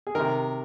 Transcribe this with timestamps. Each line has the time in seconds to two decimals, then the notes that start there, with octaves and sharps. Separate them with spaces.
0.07 G#4
0.15 C3 D#3 A#4